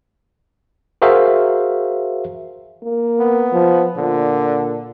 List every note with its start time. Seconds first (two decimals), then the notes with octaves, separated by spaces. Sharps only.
1.02 F#4 G#4 A#4 C5 E5 F5
2.83 A#3
3.19 B3
3.52 F3
3.97 A#2 D3